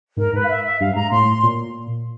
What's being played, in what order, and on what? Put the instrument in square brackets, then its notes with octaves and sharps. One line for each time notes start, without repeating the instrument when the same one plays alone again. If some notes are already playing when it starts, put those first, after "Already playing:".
[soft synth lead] G#2 [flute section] A#4
[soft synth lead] G#2 [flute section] B4
[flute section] F5
E5
E5
[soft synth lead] G2 [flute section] F5
[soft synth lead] G#2 [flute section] A#5
[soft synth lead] A2 [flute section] C6
[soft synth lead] A#2